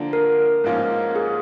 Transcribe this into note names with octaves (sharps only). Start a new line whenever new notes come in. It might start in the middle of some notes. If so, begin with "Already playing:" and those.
Already playing: D3 F3 A#3 D4
A#4
G#2 F3 A#3 C#4 F4
G#4